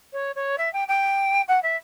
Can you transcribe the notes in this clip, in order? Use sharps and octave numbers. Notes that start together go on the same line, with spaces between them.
C#5
C#5
E5
G5
G5
F#5
E5